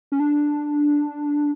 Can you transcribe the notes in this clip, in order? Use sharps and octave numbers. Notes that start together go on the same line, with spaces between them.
C#4
D4